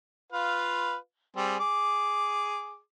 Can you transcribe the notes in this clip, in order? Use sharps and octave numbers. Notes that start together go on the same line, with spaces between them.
F4 B4 F5
G3 C4 G#4
G#4 D6